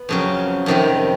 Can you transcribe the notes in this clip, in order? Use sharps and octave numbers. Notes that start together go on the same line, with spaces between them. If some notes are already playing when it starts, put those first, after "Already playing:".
Already playing: B3
F2 C#3 F#3
F2 C3 D#3 G3